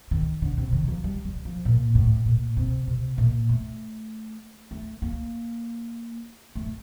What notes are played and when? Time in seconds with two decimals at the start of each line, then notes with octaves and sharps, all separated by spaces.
0.11 D#3
0.42 D3
0.58 C3
0.72 D#3
0.88 F3
1.04 G3
1.25 G3
1.45 F3
1.65 A#2
1.95 A2
2.26 A#2
2.57 C3
2.87 C3
3.18 A#2
3.49 A3
4.71 A3
5.02 A#3
6.55 A3